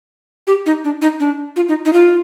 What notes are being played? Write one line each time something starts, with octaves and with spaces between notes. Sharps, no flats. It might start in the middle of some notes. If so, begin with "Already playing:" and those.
G4
D#4
D4
D#4
D4
F4
D#4
D#4
F4